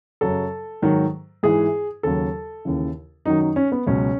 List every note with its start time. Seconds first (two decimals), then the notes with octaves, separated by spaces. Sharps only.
0.21 F#2 C#3 F#3 A4
0.82 G#2 D#3 F#3
1.43 G#2 E3 G#4
2.03 D#2 C#3 F#3 A4
2.65 D#2 C#3 E3
3.26 F#2 D#3 F#3 D#4
3.41 D#4
3.56 C#4
3.72 B3
3.87 C#2 B2 F#3 C#4